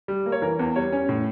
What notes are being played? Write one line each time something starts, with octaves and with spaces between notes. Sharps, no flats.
G3
A#3
C#5
E3 A#4
E2
G3 C#5
C#4
A2